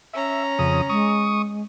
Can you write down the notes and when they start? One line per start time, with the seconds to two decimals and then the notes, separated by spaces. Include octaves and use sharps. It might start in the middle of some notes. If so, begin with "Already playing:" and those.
0.13 C#4 E5 A#5
0.59 F2 C#3 D#6
0.89 G#3 C#6 D#6